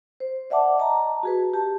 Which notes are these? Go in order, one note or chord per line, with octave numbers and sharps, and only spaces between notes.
C5
D5 E5 F#5 A5 D6
D#5 A5 A#5
F#4 G#4 B4
G4 A5